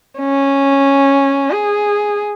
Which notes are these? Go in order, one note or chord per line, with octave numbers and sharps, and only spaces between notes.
C#4
G#4